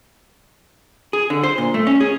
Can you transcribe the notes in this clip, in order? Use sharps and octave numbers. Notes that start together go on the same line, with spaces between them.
G#4
D3
C5
A#2
A3
C#4
G#4